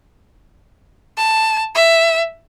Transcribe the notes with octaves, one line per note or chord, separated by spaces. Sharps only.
A5
E5